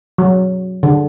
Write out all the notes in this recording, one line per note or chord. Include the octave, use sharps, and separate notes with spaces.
F#3
D3